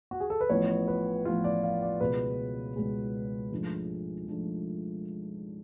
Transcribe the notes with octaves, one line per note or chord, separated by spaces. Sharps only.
F#4
G#4
A4
B4
A1 A2 F3 B3 C#5
B4
A1 A2 F3 B3 F4
D5
F5
D5
C#2 B2 G#3 B3 B4
C#2 B2 G#3 B3 G#4
G#2 F3 A3 D4
F3 A3 D4